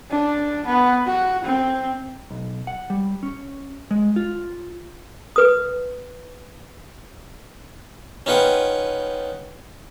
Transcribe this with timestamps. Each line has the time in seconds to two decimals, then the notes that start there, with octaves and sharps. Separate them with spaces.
0.11 D4
0.66 B3
1.06 F#4
1.44 C4
2.30 B1
2.67 F#5
2.90 G3
3.23 C#4
3.91 G#3
4.16 F4
5.36 B4 D#6
8.26 C#4 D#4 F4 B4 F#5 G5